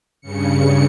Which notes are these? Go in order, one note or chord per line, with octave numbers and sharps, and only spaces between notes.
G2 C#3 C#7